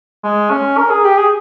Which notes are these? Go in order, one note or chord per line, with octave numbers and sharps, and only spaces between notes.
G#3
C#4
A#4
G#4
G4
G#4